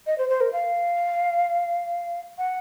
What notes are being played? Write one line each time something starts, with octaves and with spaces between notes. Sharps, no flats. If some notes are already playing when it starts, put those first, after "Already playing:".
D#5
C5
C5
A#4
F5
F#5